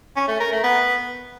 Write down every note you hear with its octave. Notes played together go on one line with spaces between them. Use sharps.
C#4
A3
A#4
A3
B3